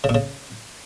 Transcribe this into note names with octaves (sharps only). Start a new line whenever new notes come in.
C#3
A#2
C#3